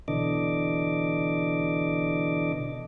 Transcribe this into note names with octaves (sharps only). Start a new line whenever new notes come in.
B2 D3 E3 D4 D#5 D6